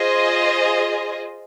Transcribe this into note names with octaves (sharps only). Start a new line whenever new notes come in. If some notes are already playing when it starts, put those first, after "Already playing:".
Already playing: F4 G#4 C5 D#5